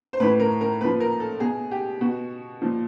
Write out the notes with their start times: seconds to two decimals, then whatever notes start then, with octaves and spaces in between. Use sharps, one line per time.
0.13 C5
0.20 A2 E3 B4
0.40 A#4
0.61 A#4
0.81 A#2 F3 B4
1.00 A#4
1.20 A4
1.40 B2 G#4
1.71 G4
2.01 B2 F#4
2.62 A#2 F3